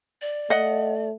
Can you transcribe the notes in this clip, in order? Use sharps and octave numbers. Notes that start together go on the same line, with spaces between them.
D5
A3 D#5 F#5